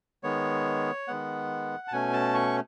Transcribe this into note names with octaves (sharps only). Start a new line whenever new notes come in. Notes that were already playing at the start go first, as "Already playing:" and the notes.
D#3 G#3 B3 C#5
D#3 G#3 B3 F#5
A5
B2 A3 C#4 G#5
A5
C#6